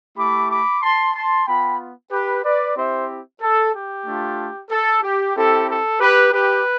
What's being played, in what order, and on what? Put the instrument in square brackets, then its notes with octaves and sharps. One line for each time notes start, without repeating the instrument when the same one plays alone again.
[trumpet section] A3 E4 G4 B5 D6
B5 D6
A5 C6
A5 C6
B3 F4 G5 B5
G4 B4
B4 D5
C4 E4 G4 C5 E5
A4
G4
A3 D4 F4
A4
G4
C4 E4 G4 A4
A4
G4 B4
G4 B4